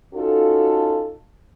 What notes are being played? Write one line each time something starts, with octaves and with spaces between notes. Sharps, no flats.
C#4 D#4 F4 F#4 A4